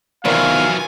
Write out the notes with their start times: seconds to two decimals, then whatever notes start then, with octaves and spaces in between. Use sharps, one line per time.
0.25 E2 C3 D#3 E3 F#3 F4 F5 G#5